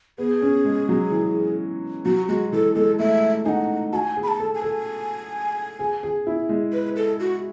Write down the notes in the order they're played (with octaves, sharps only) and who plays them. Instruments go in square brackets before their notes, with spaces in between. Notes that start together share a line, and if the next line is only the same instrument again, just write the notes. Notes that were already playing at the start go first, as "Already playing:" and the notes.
[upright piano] B3 [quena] G#4
[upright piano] C#4
G#3
F#3
E3
[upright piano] F#3 [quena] F#4
[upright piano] G#3 [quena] F#4
[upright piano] E3 [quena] A4
[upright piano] G#3 [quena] A4
[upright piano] A3 [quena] E5
[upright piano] D#4 [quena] F#5 G#5
[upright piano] F#4 [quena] A5
[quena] G#5
[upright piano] G#4
[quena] B5
A5
[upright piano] A4
[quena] G#5
[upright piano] A4
G#4
G#4
E4
G#3
[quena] B4
A4
F#4